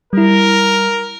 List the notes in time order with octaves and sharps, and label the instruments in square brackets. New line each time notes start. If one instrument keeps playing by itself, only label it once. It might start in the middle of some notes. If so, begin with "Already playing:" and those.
[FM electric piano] G3 E4 [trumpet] A#4